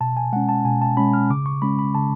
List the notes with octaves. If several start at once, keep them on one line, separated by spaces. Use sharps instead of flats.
B2 A5
G#5
G#3 C#4 F#5
A5
B2 G#5
A5
G#3 C#4 B5
F6
C#3 D6
C#6
G#3 C#4 B5
B5
C#3 A5